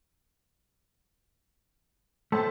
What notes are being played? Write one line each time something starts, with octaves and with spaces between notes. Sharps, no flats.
A2 A3 C5 A5